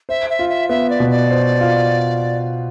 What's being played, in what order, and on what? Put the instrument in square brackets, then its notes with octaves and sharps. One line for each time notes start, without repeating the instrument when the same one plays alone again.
[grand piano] C5 [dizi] E5
[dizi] E5
[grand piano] F4
[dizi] E5
[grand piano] B3 [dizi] E5
[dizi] D5
[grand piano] B2
[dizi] D5
[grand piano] C5
F4